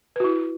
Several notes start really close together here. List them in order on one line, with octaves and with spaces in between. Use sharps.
B4 F#4 E4